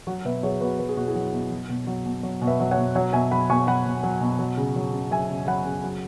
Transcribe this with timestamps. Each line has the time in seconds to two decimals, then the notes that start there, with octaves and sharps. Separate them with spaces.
0.07 F#3 F#4
0.25 B2 B4 E5
0.43 F#3 G#4 C#5
0.61 B2 F#4 B4
0.79 F#3 B4
0.89 G#4
0.97 B2 F#4
1.07 E4 G#4
1.15 F#3
1.33 B2
1.51 F#3
1.69 B2
1.87 F#3
2.06 B2
2.23 F#3
2.42 B2
2.47 B4 E5
2.60 F#3
2.71 C#5 F#5
2.77 B2
2.95 F#3 C#5 F#5
3.13 B2 E5 G#5
3.31 F#3 F#5 B5
3.49 B2 G#5 C#6
3.67 F#3 F#5 B5
3.85 B2
4.03 F#3
4.21 B2
4.39 F#3
4.57 C#3
4.76 F#3
4.93 C#3
5.11 F#3 E5 G#5
5.29 C#3
5.47 F#3 F#5 B5
5.65 C#3
5.84 F#3